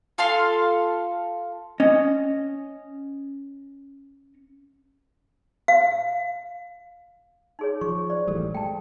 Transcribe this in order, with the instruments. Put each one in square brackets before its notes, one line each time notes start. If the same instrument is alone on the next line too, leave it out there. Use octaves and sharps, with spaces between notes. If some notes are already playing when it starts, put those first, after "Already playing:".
[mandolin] F4 A4 F5 C6
[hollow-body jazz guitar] C#4 D#5
[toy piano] F5
D#4 G#4 C#5
[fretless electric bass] F3 [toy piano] C#6
[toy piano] C5 D5
[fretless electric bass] A1 E3 G3 [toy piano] A4
[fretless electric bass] G#3 [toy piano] G5 A5